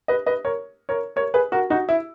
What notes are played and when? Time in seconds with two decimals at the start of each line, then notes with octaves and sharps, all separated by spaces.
0.08 B4 D#5
0.26 B4 D#5
0.45 A#4 C#5
0.89 A#4 C#5
1.16 A#4 C#5
1.34 G#4 B4
1.52 F#4 A#4
1.70 D#4 F#4
1.89 E4